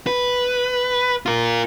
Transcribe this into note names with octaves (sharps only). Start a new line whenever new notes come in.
B4
F4 A#4